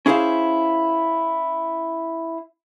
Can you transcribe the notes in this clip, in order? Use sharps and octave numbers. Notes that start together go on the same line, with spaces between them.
C#4 E4 G#4 A4 C5 F5